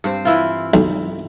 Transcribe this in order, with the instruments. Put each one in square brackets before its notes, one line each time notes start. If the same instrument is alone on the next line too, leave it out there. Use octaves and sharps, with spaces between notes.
[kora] G2 C4 C5
E3 E4 F4
[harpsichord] B1